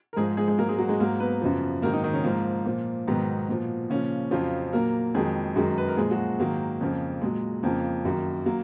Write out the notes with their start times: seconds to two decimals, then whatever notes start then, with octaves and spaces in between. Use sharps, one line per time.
0.13 A#4
0.16 G#2 F3 G#3 G#4
0.37 G#3 G#4
0.48 G#3 G#4
0.58 G#2 F#3 A#3 A#4
0.69 G#3 G#4
0.79 F#3 F#4
0.89 G#3 G#4
1.00 G#2 F#3 A#3 A#4
1.20 B3 B4
1.42 F#2 C#3 F3
1.82 G#2 D#3 F#3 A#3 A#4
1.93 D#3 D#4
2.03 D#3 D#4
2.13 C#3 C#4
2.24 G#2 F3 A#3
2.65 A#2 F3
3.07 G#2 B2 D#3 F#3 B3
3.49 A#2 F3
3.90 A#2 C#3 F3 C#4
4.31 F2 C#3 F3 F#3 F4
4.73 A#2 F#3 A#3 A#4
5.15 F2 D#3 F#3 G#3 G#4
5.56 F#2 D#3 F#3 G#3 G#4
5.78 B4
5.88 A#4
5.97 A#2 F3 G#3 G#4
6.11 F#3 F#4
6.39 G#2 D#3 F#3 A#3
6.81 F2 C#3 F3
7.21 A#2 F#3 G#3
7.63 F2 C#3 F3 A#3
8.05 F#2 D#3 F#3
8.46 F#3 A#3